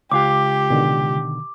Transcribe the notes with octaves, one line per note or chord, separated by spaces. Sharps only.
C#2 F4 G4 D6
B2 D3 D#3